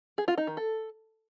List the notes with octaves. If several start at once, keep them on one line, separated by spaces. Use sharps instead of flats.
G#4
F4
D#4
D#3
A4